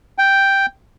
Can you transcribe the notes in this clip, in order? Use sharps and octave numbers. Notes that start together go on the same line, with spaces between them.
G5